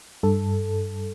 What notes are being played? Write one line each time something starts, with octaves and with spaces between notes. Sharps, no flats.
G2 A4